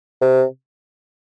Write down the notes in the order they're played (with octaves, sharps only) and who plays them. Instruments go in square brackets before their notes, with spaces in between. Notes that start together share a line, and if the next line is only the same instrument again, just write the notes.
[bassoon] C3